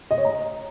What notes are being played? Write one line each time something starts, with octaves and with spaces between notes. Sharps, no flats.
D#5
C#5
A#5